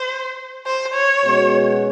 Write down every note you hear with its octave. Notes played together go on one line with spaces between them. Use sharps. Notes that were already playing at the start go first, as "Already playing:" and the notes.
Already playing: C5
C5
C#5
B2 G#3 C#4 F#4